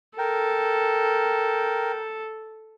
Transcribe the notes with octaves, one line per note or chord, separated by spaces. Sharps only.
A4 A#4 G5